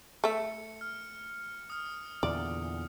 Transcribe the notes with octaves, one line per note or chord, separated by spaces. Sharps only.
A3 E5 C#7
F6
D#6 F6
E2 A#2 D3 D5